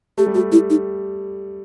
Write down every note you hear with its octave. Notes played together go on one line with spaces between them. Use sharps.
A3 G4
G3
A3 F#4
G3 E4
D#4